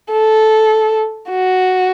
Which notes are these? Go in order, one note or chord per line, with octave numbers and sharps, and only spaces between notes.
A4
F#4